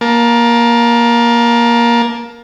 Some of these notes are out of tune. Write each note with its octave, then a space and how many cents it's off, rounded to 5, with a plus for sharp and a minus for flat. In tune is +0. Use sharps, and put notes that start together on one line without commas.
A#3 +20 A5 +0